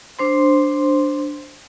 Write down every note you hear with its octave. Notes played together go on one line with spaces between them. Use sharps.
D4 C5 C6